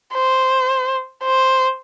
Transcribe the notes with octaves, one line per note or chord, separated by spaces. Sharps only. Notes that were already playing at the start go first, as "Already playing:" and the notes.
C5
C5